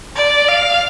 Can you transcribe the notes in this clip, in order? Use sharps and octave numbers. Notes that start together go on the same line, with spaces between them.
D5
F5